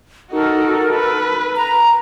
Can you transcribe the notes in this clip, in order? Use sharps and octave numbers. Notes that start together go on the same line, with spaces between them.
D#4 F#4 A4 A#4
B4
A#5